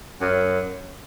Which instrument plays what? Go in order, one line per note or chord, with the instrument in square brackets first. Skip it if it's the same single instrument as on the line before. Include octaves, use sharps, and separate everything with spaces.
[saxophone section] F#2